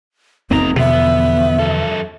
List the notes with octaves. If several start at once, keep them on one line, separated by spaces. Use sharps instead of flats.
F1 E2 G2 A#3 C4 D#4 A#5
B2 D3 F3 B3 E5
F#2 A4